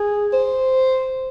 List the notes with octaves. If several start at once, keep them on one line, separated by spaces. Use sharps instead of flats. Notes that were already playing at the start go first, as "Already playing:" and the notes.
Already playing: G#4
C5